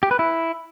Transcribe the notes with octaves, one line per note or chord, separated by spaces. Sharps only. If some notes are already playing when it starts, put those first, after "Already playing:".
G4
B4
E4